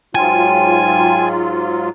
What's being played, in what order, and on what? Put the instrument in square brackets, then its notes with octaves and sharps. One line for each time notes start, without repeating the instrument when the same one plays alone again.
[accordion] G#2 F#3 F4 [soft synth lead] G5 [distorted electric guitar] G#5